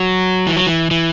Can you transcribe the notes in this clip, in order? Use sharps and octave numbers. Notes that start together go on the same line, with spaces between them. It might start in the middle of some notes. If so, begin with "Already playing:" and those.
Already playing: F#3
E3
F#3
E3
E3